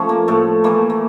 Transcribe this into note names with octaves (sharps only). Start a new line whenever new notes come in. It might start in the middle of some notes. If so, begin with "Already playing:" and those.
Already playing: F3 A3 C#4
A#3
A2 A3
E3 A3 A#3
A#3